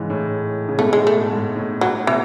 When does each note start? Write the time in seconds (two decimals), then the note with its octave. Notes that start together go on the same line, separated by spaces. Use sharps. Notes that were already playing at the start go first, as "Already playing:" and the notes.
Already playing: G#2 C#3 E3
0.10 A2
0.69 C#3
0.79 G#2 B2 A3
0.93 A2 G#3
1.07 A3
1.13 A2
1.31 G#2
1.56 A2
1.81 A2 F#3
2.07 B2 E3